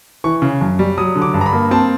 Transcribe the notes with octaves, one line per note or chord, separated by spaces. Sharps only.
E3 C#6
C#3
F#2
G3
F#3 D#6
D3
D6
G2
A#5
B5
A#3
C4 A5